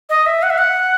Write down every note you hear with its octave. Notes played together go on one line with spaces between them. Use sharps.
D#5
E5
F#5
E5
F#5